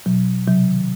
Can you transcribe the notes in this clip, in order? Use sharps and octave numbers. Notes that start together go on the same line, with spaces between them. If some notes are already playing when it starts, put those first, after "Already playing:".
B2 F#3
C3 F#3
D#3